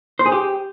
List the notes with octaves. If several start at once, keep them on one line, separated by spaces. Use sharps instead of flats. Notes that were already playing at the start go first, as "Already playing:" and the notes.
C5
G#4
G4